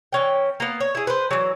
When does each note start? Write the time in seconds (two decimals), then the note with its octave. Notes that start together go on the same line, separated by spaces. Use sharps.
0.13 E3 C#4 G5
0.60 A#3 B3
0.80 C#5
0.95 E4 G#4
1.07 B4 C5
1.31 E3 F#3